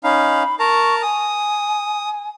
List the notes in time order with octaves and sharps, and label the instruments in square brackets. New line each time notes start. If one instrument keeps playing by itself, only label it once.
[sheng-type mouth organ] C#4 D#4 F5 [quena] B5
[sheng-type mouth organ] A#4 A5 A#5 [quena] C#6
[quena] G#5 [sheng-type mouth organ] D#6